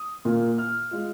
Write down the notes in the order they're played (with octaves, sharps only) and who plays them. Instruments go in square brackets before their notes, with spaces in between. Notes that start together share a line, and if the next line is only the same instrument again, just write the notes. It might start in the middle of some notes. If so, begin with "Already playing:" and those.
Already playing: [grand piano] D#6
A#2 A#3 F4
F6
G#3 F4